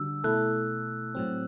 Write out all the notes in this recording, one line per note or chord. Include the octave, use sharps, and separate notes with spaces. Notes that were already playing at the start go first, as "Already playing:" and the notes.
Already playing: D3 G3 D4 F#4 E6
B2 A3 E4 A4 F#6
A2 F#3 C4